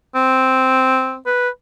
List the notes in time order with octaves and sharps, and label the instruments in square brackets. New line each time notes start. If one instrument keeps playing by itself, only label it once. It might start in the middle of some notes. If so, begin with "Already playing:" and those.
[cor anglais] C4
B4